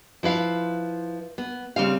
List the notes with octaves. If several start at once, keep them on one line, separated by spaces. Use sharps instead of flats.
F3 E4 B4 F5
B3
C#3 G3 C4 F5